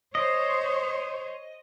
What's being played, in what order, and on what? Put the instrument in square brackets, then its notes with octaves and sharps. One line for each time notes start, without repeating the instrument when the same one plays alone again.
[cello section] C5 C#5 [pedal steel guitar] D#5